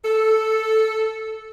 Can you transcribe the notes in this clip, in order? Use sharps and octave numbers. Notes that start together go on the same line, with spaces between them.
A4